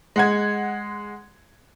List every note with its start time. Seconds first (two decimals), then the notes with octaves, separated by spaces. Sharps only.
0.16 G#3 F#5 G#6